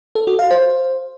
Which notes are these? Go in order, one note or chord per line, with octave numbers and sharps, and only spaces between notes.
A4
F#4
F5
C5